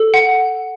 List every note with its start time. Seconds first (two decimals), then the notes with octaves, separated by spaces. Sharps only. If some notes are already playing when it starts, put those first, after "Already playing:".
Already playing: A4
0.14 F#5